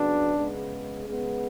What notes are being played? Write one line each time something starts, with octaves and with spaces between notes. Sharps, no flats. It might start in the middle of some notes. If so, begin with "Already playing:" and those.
Already playing: C#3 F#3 B3 D4
C#3 G#3 B3
C#3 G#3 B3